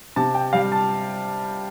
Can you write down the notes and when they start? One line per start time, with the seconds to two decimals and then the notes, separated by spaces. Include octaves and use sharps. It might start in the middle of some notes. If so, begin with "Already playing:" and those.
0.16 C3 A5
0.35 G5
0.53 G3 F5
0.72 A5